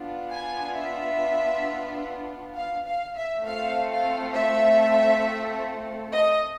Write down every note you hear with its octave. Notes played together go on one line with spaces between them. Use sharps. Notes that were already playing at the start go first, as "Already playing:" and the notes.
Already playing: B3 D4 F4
G#5
E5
F5
F5
E5
A3 C4 F4 A4 F5
F5
E5
D#5